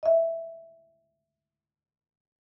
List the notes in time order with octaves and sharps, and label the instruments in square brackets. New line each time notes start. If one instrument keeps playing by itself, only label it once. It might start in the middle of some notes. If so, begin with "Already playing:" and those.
[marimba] D#5 E5